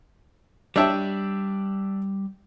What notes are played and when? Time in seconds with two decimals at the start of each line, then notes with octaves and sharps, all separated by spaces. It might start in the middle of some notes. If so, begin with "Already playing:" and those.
0.76 G3 D4 C#5 E5 G5 A5